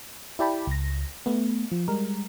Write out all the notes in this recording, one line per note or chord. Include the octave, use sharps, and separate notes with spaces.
E4 G4 D5 G5 A5 B5
C#2 A#6
A3 B3
F3
G3 G#3 A#4